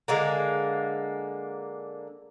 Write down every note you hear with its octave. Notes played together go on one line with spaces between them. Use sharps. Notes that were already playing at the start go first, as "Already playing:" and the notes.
D3 G#3 A#3